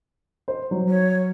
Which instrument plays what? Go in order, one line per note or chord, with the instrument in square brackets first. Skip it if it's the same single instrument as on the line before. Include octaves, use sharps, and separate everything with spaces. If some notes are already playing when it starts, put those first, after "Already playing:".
[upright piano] C5
F#3
[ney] C#5